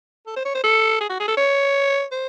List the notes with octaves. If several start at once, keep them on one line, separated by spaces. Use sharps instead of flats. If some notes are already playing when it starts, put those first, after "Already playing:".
A4
C5
C#5
C5
A4
G#4
F#4
G#4
A4
C#5
C5